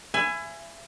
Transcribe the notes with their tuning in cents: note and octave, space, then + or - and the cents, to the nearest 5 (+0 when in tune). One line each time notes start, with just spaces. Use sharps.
E5 +30 G#5 +0 B5 +25